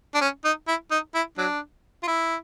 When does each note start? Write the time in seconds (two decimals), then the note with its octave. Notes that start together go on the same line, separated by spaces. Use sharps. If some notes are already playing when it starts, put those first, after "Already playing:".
0.15 D4
0.21 C#4
0.44 D#4
0.68 E4
0.91 D#4
1.14 E4
1.38 F#3 D4
2.03 F4
2.08 E4